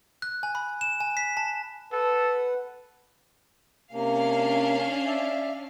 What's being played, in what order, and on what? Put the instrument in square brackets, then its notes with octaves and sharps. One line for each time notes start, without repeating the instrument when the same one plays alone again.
[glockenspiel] F#6
G#5
B5
E7
G#5
B6
A5
[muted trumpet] A4 [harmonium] B4 F#5
[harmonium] C3 A#3 [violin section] C#4 D4 F5
[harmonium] D5 E5